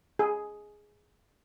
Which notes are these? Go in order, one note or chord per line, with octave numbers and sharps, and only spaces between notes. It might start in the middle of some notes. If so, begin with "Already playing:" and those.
G#4